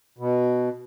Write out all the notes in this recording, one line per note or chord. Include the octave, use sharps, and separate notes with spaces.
B2